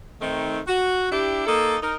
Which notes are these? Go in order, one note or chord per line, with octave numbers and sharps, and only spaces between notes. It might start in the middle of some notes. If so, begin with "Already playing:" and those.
D#3 A3 C4 D#4
F#4
D4 E4 G4
A#3 D#4 A4
D#4 A#4